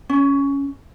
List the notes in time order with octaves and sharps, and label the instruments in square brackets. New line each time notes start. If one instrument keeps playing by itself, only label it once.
[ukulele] C#4